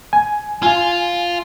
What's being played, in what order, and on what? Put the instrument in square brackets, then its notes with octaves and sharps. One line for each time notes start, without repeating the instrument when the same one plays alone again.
[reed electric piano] G#5
[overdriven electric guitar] F4 F5 [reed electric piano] G#5